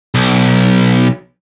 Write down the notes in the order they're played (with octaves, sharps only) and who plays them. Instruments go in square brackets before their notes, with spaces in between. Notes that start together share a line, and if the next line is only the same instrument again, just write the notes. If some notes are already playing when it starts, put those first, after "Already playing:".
[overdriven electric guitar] B1